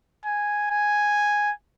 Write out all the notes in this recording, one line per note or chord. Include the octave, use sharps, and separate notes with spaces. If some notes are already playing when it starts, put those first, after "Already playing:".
G#5
G#5